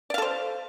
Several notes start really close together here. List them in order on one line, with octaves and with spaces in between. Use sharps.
D5 F5 A4 C5